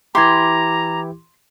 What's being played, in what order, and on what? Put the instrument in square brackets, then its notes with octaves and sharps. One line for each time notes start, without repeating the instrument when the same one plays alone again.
[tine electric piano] E3 E4 G4 [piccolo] A#5 [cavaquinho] C6 [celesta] D6 G#6